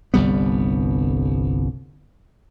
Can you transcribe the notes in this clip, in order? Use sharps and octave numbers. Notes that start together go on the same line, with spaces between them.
G1 C2 G3 B3